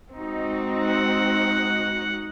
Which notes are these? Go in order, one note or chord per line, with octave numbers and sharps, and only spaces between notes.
G#3 C4 D#4 F#4
F#5